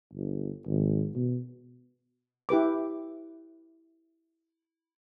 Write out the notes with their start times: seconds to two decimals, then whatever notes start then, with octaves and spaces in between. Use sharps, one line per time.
0.13 G1
0.67 G#1
1.15 B2
2.49 E4 G4 B4 D6